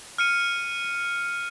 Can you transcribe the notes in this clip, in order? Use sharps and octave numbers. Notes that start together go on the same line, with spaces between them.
F6 C#7 D#7